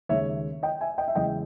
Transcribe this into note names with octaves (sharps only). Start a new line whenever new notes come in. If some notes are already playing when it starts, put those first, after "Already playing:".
D#2 C#3 G#3 C#5 E5
D#5 G5
E5 G#5
D#5 G5
E5
E2 C#3 G#3 D#5 G5